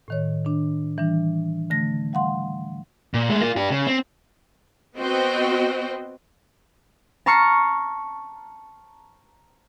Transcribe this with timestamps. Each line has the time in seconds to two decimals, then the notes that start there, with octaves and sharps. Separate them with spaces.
0.08 A2 D#3 C#5
0.45 D#3 D4
0.98 E3 G3 D4
1.70 D3 A3 A#6
2.13 G3 F5 F#5 C6
3.14 A#2
3.29 G#3 A3
3.41 A#3 F4
3.56 D4 G4
3.71 C#3
3.87 C4
4.97 B3 C4 F#4 C5 D#5 G5
7.26 A5 A#5 C#6 F6 C7 C#7